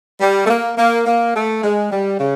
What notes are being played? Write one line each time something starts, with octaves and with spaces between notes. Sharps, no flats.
G3
A3
A#3
A#3
A#3
A3
G#3
G3
C#3